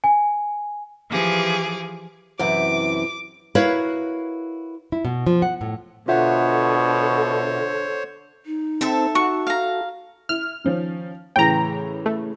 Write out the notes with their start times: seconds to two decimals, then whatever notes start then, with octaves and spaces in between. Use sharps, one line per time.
0.04 G#5
1.10 E3 F3 G4 G#4 D6
2.39 F#2 C3 E3 D6
3.55 E4 F#4 A#4 B4 C#5 F5
4.92 E4
5.05 B2
5.26 F3
5.42 F#5
5.61 A2
6.08 B2 D3 F4 A4 C5 C#5 E5 F#5
8.46 D#4
8.81 C4 A4 E5
9.15 F#4 C#6
9.47 F5 A#5
10.29 E4 F6
10.64 D#3 F3 C#4
11.36 A2 C#3 E3 G5 A#5
12.06 A3